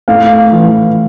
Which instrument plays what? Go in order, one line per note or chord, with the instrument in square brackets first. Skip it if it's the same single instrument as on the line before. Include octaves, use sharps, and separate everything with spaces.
[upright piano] A2 F5
E3